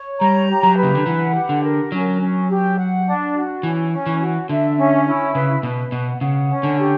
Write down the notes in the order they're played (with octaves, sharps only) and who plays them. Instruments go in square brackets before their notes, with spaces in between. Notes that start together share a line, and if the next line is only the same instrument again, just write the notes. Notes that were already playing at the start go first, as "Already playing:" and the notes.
Already playing: [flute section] C#5
[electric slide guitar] G3 [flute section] A#5
[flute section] G4
[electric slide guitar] F#3
[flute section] B4
[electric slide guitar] C#3
D3
[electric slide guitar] E3 [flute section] F#5
[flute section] G4
[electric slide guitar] D3
[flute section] A#4
[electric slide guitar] F#3 [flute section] C#4
[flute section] C#4
G4
F#5
D4
F#4
[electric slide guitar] E3 [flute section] C#4
[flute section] C#4
[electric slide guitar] E3
[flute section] F#4
[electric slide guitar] D3 [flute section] E5
[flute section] C#4
E4
[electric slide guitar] C#3 [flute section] B4
[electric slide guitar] B2 [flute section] B4
[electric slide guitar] B2 [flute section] F#5
[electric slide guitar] C#3 [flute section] F#5
[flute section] C#4
[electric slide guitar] D3
[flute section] G4